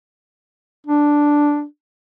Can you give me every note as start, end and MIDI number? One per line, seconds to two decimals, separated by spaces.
0.87 1.64 62